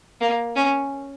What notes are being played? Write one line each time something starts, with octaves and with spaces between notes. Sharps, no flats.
A#3
C#4